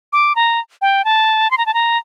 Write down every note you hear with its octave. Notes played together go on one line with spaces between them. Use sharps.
D6
A#5
G5
A5
C6
A#5
A5
A#5